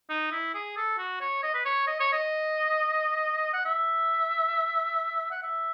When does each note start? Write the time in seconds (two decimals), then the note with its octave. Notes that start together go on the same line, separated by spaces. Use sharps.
0.10 D#4
0.32 E4
0.54 G#4
0.77 A4
0.98 F#4
1.21 C#5
1.43 D#5
1.54 B4
1.65 C#5
1.87 D#5
2.00 C#5
2.13 D#5
3.53 F#5
3.65 E5
5.31 F#5
5.43 E5